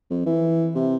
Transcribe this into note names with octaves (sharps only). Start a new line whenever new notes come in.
F2
E3
C3